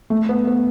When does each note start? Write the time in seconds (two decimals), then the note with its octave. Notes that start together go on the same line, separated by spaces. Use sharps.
0.10 A3
0.29 B3
0.47 B3